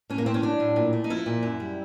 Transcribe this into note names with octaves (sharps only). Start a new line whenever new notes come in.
A2 C#4
A#3
A3 C4
C#4
F#3 D4
A2
A#2
A3
D#4
F3 E4
A#2
F#2
G3